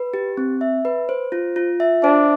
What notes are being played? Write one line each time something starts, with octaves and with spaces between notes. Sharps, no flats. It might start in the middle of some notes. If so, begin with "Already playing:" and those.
Already playing: B4
G4
C4
E5
B4
C5
F4
F4
E5
D4 C5